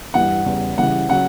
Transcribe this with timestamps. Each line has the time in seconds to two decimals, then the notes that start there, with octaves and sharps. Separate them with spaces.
0.14 G2 E3 G3 F#5
0.46 E2 C#3 G3
0.77 C#3 E3 G3 F#5
1.09 C#3 F#3 F#5